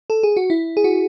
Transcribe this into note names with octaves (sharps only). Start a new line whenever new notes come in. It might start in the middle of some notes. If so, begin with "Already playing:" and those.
A4
G#4
F#4
E4
G#4
F#4